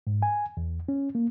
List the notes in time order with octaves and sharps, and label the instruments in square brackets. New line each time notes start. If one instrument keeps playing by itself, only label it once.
[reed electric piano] G#2
G#5
E2
C#4
A#3